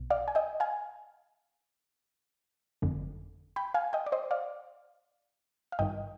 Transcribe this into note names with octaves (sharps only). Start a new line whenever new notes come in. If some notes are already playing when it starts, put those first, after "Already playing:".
Already playing: B1 B2
D5 F5
G#5
D#5 G5
F5 G#5
G1 F2 D3
G5 B5
F5 G#5
D#5 G5
D5
C5 D#5
D5 F5
F5
G#1 G2 D#3 D#5 G5